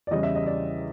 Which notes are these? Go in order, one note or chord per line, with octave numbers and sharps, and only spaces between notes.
D5
E2 C#3 E3 G3 D#5
E5
D#5
D5